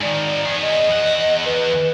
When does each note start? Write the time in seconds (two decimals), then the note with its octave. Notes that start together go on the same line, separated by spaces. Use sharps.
0.01 G#2 D#3 D5
0.46 B3 G#4
0.61 D#5
0.89 E2 F#5
1.45 B4